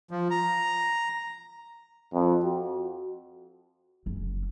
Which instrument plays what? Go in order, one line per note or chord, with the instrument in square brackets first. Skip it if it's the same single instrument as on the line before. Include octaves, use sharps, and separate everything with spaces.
[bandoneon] F3
A#5
[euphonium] F2
F#4
[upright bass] F#1